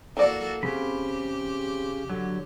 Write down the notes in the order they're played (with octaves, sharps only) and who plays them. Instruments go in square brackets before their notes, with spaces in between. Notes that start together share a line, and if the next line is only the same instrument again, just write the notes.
[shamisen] E3 D5 [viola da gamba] A#3 F#4 A4
[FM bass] C#3 [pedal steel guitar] C4 B5 [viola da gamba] G4
[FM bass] D3 [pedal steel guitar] F#3